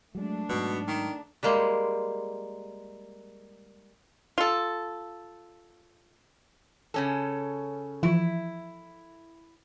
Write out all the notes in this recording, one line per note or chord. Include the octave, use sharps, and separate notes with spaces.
F#3 G#3 A3 D4
G#2 B2 F#3
D#3
G3 G#3 A#3 G#4 C5
F4 A4
C#3 C#4 A4
E3 F3 E4